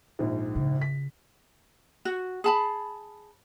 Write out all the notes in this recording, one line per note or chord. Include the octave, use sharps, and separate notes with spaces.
A#1 G#2
C#3
B6
F#4
G#4 A5 B5